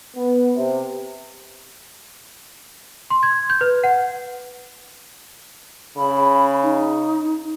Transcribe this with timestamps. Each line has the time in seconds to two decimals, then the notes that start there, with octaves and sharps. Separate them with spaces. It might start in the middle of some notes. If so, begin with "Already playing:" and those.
0.16 B3
0.56 C3
3.10 C6
3.23 G#6
3.50 G6
3.61 B4
3.84 F#5
5.97 C#3 B5
6.63 D#4